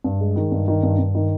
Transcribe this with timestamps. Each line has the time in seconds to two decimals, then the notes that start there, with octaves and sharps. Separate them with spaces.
0.04 G2
0.20 G#3
0.36 D#3
0.51 G2
0.68 D#3
0.83 G2
0.99 G2
1.15 D#3